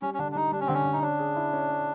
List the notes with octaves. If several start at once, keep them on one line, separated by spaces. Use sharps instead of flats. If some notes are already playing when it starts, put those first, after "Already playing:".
G3 C#4
C#4
D3 D4
D4
G3 D#4
G3 D4
C#4
D3 C4
C#4
D3
D#4
C#4 D4
G#4
E4
C#4
C#4